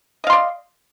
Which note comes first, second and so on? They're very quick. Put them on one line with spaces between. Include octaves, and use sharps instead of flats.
D#5 F5 C6 D5